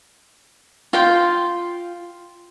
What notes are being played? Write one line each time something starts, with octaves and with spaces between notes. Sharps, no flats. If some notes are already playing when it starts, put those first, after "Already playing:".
F4 G5 C6